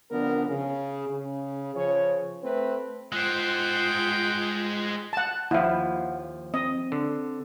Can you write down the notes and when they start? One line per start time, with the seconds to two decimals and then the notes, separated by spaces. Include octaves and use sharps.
0.11 F2 D3 B3 D4 A#4
0.47 C#3
1.08 C#3
1.74 C#3 F3 C#5
2.43 A3 C4 B4
3.12 G#3 F4 C5 F#5 G5
5.13 F#5 A5
5.51 D#2 F3 E4 F5 F#5
6.54 C4 D#5
6.92 D3